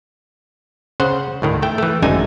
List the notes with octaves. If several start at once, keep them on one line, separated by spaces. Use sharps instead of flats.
C#3 C5 F#5
D2 A2 D#3
A3 G5
E3 A3
G#1 F#2 D3 A3 D#4 G#5